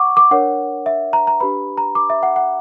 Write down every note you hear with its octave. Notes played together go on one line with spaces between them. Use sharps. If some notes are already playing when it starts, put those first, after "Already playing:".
Already playing: F#5 C#6 D6
D6
D4 A#4 C#5 F#5
E5
A#5
A#5
D4 G4 B4 B5
A#5
D6
E5
F#5
F#5